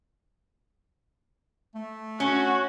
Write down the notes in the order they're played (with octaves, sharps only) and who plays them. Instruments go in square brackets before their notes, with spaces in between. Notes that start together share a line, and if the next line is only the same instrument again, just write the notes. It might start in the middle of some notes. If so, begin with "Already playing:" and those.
[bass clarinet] A3
[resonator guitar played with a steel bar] C#4 [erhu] F#4